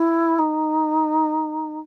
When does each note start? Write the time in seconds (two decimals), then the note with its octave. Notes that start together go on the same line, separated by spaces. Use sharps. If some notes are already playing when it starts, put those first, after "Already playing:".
Already playing: E4
0.38 D#4